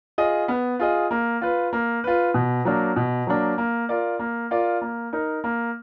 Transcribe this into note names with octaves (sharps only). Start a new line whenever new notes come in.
F4 G#4 D#5
B3
F4 G#4 D#5
A#3
F4 B4
A#3
F4 B4
B2
F#3 A#3 D4
B2
F#3 A#3 D4
A#3
F4 A#4 D5
A#3
F4 A#4 D5
A#3
D#4 A#4
A#3